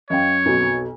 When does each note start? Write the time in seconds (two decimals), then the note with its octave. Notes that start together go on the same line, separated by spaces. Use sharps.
0.10 F#2 C#5 D#5 F5 G5
0.46 B1 F2 B2